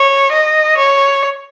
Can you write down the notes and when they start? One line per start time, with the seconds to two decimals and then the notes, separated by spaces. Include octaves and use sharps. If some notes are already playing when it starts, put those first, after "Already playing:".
Already playing: C#5
0.32 D#5
0.78 C#5